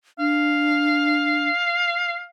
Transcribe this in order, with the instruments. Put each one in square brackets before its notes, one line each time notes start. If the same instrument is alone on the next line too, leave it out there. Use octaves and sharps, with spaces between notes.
[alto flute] D4 [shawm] F5